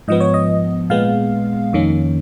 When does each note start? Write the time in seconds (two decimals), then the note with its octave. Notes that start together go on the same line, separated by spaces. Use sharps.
0.08 G#2 F3 B3 D#5
0.20 C#5
0.34 D#5
0.90 A#2 G#3 B3 F5
1.73 F2 D#3 A#3 C#4